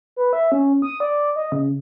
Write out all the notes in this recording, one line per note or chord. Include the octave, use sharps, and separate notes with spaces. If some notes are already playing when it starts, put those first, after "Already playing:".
B4
E5
C#4
D#6
D5
D#5
C#3